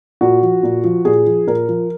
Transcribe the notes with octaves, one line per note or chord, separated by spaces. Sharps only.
A#2 F#4
F3
A#2
F3
A#2 G#4
F3
A#2 A#4
F3